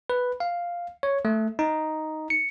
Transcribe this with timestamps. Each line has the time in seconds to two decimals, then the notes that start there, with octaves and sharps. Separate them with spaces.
0.10 B4
0.40 F5
1.03 C#5
1.25 A3
1.59 D#4
2.30 C#7